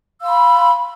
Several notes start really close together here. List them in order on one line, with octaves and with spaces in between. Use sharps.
E6 F5 C6 B5